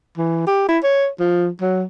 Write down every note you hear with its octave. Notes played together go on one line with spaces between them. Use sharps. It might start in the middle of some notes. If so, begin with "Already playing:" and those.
E3
G4
E4
C#5
F3
F#3